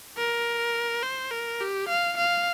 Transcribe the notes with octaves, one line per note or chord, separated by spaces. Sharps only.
A#4
C5
A#4
G4
F5
F5